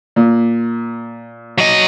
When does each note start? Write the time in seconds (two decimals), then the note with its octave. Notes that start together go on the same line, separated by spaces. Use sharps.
0.16 A#2
1.58 F#3 D#5